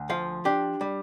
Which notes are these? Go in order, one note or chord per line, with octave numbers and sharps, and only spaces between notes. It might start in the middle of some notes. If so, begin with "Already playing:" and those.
Already playing: D2
F3 F5
D4 G4
G3